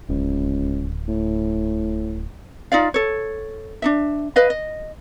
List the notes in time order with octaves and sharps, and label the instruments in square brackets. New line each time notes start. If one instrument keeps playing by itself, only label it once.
[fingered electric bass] D1 [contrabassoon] C#2
[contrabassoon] A2
[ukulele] D#4 F4 D5 F5
A4 C#5
D4 D#4 E5
B4 D#5 F5
D#5